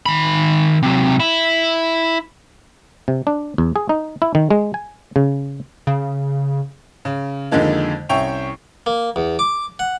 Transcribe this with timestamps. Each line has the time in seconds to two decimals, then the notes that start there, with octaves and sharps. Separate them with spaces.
0.06 D#3 B5
0.83 C3 F#3
1.20 E4
3.08 C3
3.27 D4
3.58 E2
3.76 G#4
3.89 D#4
4.22 E4
4.35 D#3
4.51 G#3
4.74 G#5
5.16 C#3
5.87 C#3
7.05 C#3
7.51 F2 D3 D#3 G#3 A#3
8.09 C2 C#4 E5 G5 C#6 F7
8.86 A#3
9.16 E2
9.39 D6
9.79 F#5